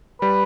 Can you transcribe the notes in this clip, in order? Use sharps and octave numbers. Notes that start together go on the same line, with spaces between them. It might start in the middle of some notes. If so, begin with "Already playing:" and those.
G3 B4